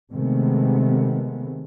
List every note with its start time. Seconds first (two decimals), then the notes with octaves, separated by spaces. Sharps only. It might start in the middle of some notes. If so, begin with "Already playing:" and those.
0.11 C3 D#3 G#3 A3 B3